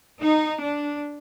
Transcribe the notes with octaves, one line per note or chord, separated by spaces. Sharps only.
D#4
D4